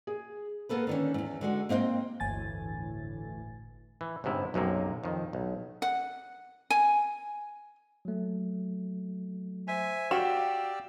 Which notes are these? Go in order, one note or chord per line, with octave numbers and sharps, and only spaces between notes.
G#4
A#3 B3 A4 B4
D3 D#3 C#4
E2 G#2
D3 G#3 F#4
A#3 C4 D#5 F5 G5
G1 D2 A2 E3 G#5 A6
E3
G1 G#2 C3 E4
B1 F#2 C3 A#3
F2 D#3
B1
F#5
G#5
F#3 A3
C5 E5 G#5
F#4 G4 D5 F5 G5 E6 E7